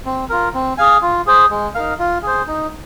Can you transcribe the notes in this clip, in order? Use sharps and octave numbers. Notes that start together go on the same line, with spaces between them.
C4
F4 A#4
C4
G#4 F5 G#5
F4
G#4 C5
G#3
D#4 A#4 F5
F4
G#4 C5
D#4